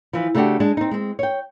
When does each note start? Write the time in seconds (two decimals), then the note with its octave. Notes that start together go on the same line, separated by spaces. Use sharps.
0.13 E3 F3
0.35 C#3 A3 B3 D4 F#4 G4
0.60 G#3 D4
0.77 C4 D#4
0.91 G#3 C4
1.19 C#5 G5